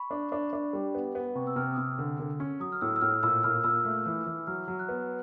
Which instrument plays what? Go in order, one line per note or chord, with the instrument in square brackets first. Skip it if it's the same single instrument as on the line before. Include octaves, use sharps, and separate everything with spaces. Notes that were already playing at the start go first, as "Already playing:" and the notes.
Already playing: [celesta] B5 C#6
[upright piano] D4
D4
D4
G3
B3
B3
[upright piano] C3 [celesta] C#6
[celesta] E6
[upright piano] C3 [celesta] F6
[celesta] D#6
[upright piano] C3 [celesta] E6
[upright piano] D3
D3
C#4
[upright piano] F#3 [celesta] D#6
[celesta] F6
[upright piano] A2 [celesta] E6
[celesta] E6
[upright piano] A2 [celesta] F6
[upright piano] A#2 [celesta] E6
[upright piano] A#2 [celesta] F6
[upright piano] A#2 [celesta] E6
[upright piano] A3
E3
E3
[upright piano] F#3 [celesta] F6
[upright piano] F#3
[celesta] F#6
[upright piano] B3